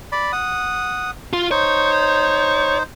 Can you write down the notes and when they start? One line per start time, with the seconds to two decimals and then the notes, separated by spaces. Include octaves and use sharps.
0.12 D5 B5
0.33 F#5 D#6
1.33 F4
1.51 D#4 C5 C#5